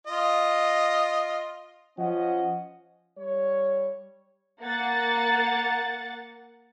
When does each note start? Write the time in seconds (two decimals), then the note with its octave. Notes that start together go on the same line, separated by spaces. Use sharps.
0.07 F4 D#5
1.98 F3 C#4 D#5 F#5
3.17 G3 C#5
4.61 A#3 F#5 A6